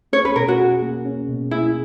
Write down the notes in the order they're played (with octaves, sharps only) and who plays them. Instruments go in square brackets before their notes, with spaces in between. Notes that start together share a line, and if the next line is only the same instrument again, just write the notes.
[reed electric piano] C#4 [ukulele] C#5
[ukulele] B4
[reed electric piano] B2 [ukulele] A#4
[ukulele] F#4
[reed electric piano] G#4
A#3
C#4
B2
[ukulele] E4 [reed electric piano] G#4